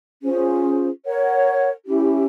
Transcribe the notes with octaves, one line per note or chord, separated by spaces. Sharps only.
C#4 F4 G#4 C5
A#4 C#5 F#5
C#4 E4 G4